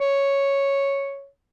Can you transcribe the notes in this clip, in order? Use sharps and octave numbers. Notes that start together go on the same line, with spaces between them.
C#5